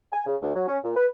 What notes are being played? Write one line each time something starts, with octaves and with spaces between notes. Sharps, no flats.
G#5
C#3
D2
F#3
C#4
A#2
B4